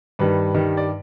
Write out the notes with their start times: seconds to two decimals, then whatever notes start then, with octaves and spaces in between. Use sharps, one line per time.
0.19 G2 D#3 G3 B4
0.54 G2 D#3 G3
0.77 D5